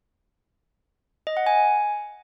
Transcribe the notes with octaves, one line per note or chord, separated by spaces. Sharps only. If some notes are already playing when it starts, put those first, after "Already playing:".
D#5
F#5
G#5